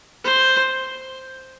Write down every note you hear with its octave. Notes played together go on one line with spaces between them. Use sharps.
C5